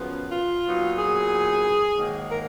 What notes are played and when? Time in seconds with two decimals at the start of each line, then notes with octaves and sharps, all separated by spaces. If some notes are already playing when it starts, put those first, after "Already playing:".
Already playing: F#2 C#3 F3 B3
0.31 F4
0.65 A#2 F#3 B3 D#4
0.98 G#4
1.97 G#2 D#3 F#3 A#3
2.30 A#4